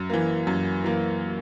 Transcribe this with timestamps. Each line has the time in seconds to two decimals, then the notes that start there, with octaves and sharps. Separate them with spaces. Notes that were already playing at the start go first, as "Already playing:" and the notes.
Already playing: F#2
0.10 E3 A#3
0.47 F#2
0.84 E3 A#3